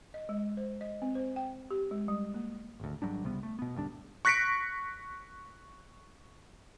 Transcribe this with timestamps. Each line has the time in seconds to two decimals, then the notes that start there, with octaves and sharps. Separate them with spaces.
0.14 D#5
0.29 G#3
0.57 C5
0.81 D#5
1.02 C4
1.15 C5
1.36 G5
1.71 G4
1.91 G#3
2.08 G3
2.34 A#3
2.80 G#1 D2
3.02 G#1 F#3 G3 D4
3.24 C#2 C3 G3 B3
3.43 A3
3.59 B2 B3
3.75 G#1 D2 G3 D4
4.25 C#6 F#6 A#6 B6 C#7 D7